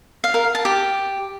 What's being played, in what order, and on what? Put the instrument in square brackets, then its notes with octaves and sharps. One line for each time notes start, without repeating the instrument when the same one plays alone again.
[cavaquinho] F5
A#4
F5
A5
G4